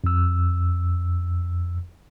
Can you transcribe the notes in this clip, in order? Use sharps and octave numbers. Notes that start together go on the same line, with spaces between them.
F2 E6